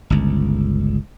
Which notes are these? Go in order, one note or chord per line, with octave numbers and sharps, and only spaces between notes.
G1 C#2